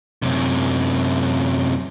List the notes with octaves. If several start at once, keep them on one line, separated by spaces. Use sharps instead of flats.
F#2 C3